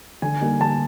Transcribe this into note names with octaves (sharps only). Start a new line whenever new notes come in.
D3 G#5
G3 A#3 D#4
D3 A5